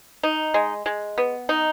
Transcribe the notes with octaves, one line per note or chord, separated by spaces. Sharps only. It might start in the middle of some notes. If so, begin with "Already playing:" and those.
D#4
G#3
G#3
B3
D#4